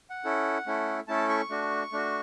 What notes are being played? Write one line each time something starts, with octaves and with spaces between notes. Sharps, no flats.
F#5
C#4 E4 A4
A3 C#4 E4 A4
A3 C#4 E4 A4 A5
C#6
A3 D4 F#4
A3 D4 F#4